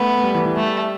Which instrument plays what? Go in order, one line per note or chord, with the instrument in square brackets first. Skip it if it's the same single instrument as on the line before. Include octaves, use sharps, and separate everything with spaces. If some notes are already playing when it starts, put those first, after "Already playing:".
Already playing: [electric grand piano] A3 [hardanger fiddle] B3
[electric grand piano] A3
G3
E3
E3
[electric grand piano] G3 [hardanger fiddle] A3